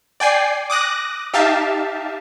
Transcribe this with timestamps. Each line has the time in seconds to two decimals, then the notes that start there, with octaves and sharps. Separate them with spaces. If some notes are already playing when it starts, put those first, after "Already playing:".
0.20 D5 G5 G#5 C7
0.70 D6 D#6 F#6 A#6
1.33 D#4 G4 E5 F5 A5